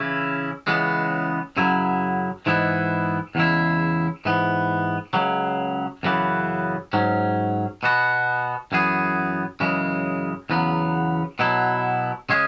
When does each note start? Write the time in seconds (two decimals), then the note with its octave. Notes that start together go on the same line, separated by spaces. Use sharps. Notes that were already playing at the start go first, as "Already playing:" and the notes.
Already playing: C#3 E3 C#4 E4
0.67 C#2 C#3 E3 G#3 B3
1.57 F#2 C#3 F#3 E4
2.46 G#2 E3 G#3 B3 E4
3.35 E2 C#3 G#3 E4
4.25 G#2 E3 B3
5.13 C#2 C#3 F#3
6.03 F#2 C#3 E3 B3
6.93 G#2 F#3 C#4
7.83 B2 B3 F#4
8.72 F#2 E3 B3 G#4
9.60 F#2 C#3 E3 G#3
10.50 E2 C#3 F#3 B3
11.39 B2 F#3 B3 E4
12.29 C#3 G#3 C#4 G#4